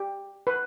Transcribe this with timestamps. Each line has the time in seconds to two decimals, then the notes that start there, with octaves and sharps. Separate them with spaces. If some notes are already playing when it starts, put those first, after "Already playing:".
Already playing: G4
0.47 B4